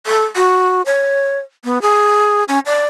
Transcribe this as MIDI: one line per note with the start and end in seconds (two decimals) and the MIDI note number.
0.06 0.24 69
0.36 0.82 66
0.86 1.38 73
1.64 1.78 59
1.82 2.44 68
2.48 2.59 61
2.66 2.87 74